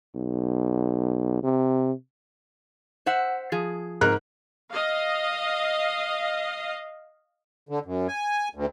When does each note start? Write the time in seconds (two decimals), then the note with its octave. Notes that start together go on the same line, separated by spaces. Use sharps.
0.16 B1
1.44 C3
3.06 C5 E5 F#5
3.52 F3 G#4
4.01 G#2 A#4 F#6
4.71 D#5 F5
7.69 D3
7.85 F#2
8.08 G#5
8.55 D2